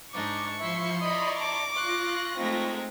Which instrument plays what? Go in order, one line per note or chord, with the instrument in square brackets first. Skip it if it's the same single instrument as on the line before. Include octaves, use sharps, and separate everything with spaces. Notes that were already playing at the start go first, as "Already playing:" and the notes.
[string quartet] G#2 D4 D#4 [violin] C#6 [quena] D6
[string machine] F3 C#7 [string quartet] E4 C6 [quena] E5
[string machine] D5 A#5 C#6 [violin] D#5 B5 [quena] D#6
[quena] A5 [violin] D6
[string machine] F4 A#6 [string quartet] C6 F#6 [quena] C#6
[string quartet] G#3 A3 D#4 [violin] C4